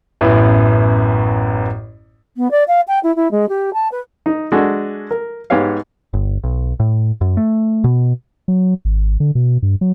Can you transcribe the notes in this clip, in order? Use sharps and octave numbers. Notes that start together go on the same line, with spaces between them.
A1 F#2 B3 E4
B3
D5
F5
G5
E4
E4
G#3
G4
A5
B4
D#4
G#3 D4 F#4 A4
A#4
G#2 B3 G4 C#5 F5
G1
B1
A2
F#2
A3
B2
F#3
G#1
D3
B2
G2
F#3